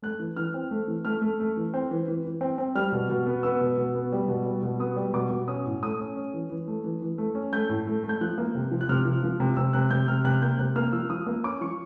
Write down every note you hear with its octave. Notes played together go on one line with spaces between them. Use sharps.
A3 F#6
E3
E3 F6
C4
A3
E3
A3 F6
A3
A3
E3
C4
E3
E3
E3
C4
C4
G3 F6
B2
B2
B3
B3 E6
B2
B2
B3
G3
B2
G3
B2
B3 D#6
G3
B2 D6
B2
C#4 D#6
A2
A3 D#6
C#4
C#4
E3
E3
A3
E3
E3
A3
C#4
A3 G6
A2
A3
A3
G6
F3 F#6
A#3
C3
F3
F#6
C3 F6
F3
F3
C3
C3 E6
C3 F#6
C3 G6
C3 F6
C3 F#6
A#3 G6
C3 F#6
A#3 F6
F3 E6
F3 D#6
A#3
C#4 D6
F3 C#6